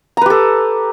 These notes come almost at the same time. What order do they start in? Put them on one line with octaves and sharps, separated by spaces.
A#5 B4 G4 A4